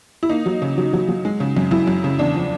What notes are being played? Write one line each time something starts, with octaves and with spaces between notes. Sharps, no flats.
E4
A#3 D#4
F#3
C#3
F#3
F#3
F#3
G#3
C#3
F#2
F#2 E4
F#2
C#3
E2 D4
F3